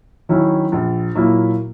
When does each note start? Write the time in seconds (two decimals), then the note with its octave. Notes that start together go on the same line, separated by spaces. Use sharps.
0.29 D#3 F#3 C#4 E4
0.72 A#1
1.15 A#2 F#3 A#3 E4